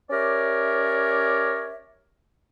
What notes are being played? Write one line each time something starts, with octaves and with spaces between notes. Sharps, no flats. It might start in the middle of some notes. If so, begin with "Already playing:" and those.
C#4 G4 A#4 C#5 D5 E5